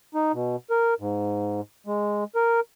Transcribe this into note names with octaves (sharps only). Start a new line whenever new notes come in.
D#4
B2
A#4
G#2
G#3
A#4